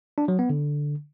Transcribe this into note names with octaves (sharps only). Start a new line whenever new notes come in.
D4
F#3
B3
D3